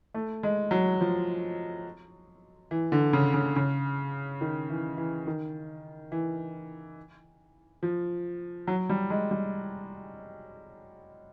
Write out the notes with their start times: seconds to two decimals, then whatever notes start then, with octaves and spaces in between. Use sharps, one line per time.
0.14 A3
0.43 G#3
0.71 F#3
1.00 F3
2.71 E3
2.92 D3
3.13 C#3
3.34 C#3
3.56 C#3
4.41 D#3
4.70 E3
4.97 E3
5.27 D#3
6.12 E3
7.83 F3
8.67 F#3
8.89 G3
9.10 G#3
9.31 G3